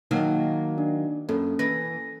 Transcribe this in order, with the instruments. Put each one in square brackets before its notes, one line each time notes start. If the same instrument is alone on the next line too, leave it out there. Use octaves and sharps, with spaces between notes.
[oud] D#3 F#3 A#3 [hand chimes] D#4 F#5
[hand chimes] D4
[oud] F#2 [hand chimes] A#3 C#4 A4
[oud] E3 B4 [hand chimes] A#6